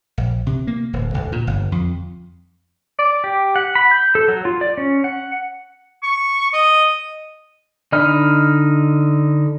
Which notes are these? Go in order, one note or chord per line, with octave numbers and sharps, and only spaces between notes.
A#1
C3
A#3
D1
B1
A#2
G1
F2
D5
G4
F#5
B5
G6
A4
F#3
F4
D5
C#4
F#5
C#6
D#5
D3 D#4 D#5 B5 F6